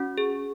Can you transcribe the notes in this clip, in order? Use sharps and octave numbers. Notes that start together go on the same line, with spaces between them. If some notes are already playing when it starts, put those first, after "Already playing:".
Already playing: C#4 F#4
G#4